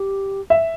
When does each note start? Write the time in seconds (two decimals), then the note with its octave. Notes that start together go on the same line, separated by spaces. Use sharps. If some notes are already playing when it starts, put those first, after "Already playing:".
Already playing: G4
0.50 E5